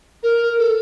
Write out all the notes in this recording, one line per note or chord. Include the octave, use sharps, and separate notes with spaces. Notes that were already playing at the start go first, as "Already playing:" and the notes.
A#4
A4